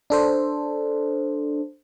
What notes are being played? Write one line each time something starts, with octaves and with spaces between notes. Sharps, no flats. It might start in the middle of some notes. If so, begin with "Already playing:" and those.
D4 A4 C5